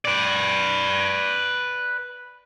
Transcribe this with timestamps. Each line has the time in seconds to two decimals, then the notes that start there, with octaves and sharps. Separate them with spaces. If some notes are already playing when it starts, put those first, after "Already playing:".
0.05 B4 D5